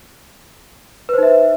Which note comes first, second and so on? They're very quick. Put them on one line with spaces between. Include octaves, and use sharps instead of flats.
B4 C5 D#4 E5